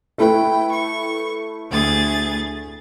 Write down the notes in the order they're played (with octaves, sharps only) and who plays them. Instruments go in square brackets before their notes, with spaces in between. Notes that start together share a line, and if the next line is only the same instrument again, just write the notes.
[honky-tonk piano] A3 E4 B4 [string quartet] G5
[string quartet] C#6
D2 G#4 A6